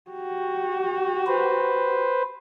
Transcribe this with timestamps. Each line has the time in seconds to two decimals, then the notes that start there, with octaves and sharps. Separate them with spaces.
0.11 F#4 G4
1.27 B4 C5